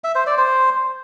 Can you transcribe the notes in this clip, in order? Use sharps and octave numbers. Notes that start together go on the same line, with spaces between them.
E5
C5
D5
C5